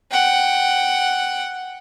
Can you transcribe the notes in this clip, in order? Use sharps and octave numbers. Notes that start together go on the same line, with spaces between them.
F#5 G5